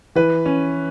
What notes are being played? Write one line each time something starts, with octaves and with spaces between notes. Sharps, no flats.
E3 B4
C#4